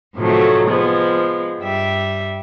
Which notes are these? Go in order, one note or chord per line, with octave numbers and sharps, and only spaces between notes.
A2 C3 D#3 F3 F#3 A3
F3 G#3 B3
G2 G3 E5